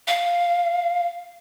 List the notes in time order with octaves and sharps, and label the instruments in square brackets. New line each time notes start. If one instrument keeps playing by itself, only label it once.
[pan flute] F5